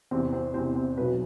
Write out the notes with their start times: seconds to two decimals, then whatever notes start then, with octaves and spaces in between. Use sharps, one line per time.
0.11 E2 C3 E3 C4 C5
0.33 C4 C5
0.54 E2 C3 E3 C4 C5
0.76 C4 C5
0.98 B1 B2 B4